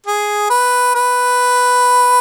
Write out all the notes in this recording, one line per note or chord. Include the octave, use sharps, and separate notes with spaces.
G#4
B4
B4